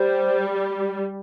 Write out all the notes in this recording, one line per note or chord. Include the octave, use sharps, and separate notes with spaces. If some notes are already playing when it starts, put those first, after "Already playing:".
Already playing: G3 C5